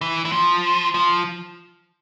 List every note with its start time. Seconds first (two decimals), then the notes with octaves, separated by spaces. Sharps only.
0.01 E3
0.25 E3
0.32 F3
0.94 F3